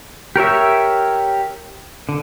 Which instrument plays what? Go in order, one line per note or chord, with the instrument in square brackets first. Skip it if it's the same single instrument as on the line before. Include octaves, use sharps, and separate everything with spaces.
[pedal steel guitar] G4 A#4 C#5 E5
D3